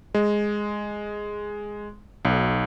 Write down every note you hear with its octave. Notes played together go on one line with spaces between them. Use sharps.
G#3
B1